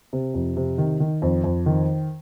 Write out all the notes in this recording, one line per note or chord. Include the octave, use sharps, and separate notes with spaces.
C3
F2
C3
D#3
D#3
F2
F2
D#3